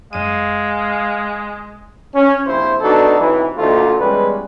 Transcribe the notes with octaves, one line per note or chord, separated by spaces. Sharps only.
F#2 G#3 F5 D#7
C#4
A#1 C3 F3 E4 C5
B3 D4 D#4 F#4 A4
B1 C3 E3
D2 A#2 A3 D#4 F4
E2 G3 G#3 C#4 B4